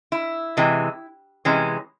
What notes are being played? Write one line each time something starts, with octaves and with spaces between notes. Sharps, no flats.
E4
C3 E3 G#3
C3 E3 G#3 C#4